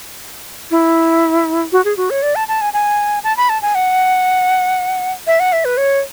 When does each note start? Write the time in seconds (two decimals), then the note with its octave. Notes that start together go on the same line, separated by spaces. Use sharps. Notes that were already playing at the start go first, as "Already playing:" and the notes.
0.71 E4
1.72 F#4
1.85 G#4
1.97 F#4
2.10 C#5
2.22 D5
2.35 A5
2.48 A5
2.61 G#5
2.74 G#5
3.24 A5
3.37 B5
3.49 A5
3.62 G#5
3.75 F#5
5.27 E5
5.40 F#5
5.53 E5
5.65 B4
5.77 C#5